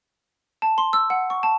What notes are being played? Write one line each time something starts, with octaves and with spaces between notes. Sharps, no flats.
A5
C6
E6
F#5
C#6
A5